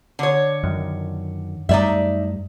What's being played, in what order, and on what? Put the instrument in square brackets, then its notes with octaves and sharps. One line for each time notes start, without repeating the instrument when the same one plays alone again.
[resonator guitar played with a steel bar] D3 C#5
[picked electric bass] F#2 D#3
[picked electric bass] F#2 G3 A3 [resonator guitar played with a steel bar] D#4 D5 E5